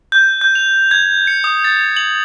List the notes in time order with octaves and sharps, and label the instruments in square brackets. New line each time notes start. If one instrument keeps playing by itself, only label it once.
[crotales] G6
G6
F7
G#6
C#7
D#6
A6
F#7